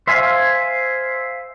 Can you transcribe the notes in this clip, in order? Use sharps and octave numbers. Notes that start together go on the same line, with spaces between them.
C5 E5 F5 G#5